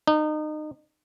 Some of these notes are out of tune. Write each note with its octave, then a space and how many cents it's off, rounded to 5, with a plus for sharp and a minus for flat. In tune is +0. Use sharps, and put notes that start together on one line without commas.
D#4 -30